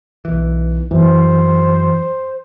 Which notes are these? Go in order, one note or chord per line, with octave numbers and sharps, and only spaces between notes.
B1 E3
F#2 E3 C5